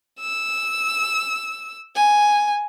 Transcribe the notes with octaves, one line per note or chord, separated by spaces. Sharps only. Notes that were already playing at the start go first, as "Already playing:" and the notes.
E6
G#5